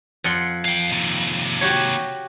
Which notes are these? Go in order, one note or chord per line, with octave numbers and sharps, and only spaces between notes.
F2 F#5 C6
F5 G5
D#2 C3
F#4 G4 C#5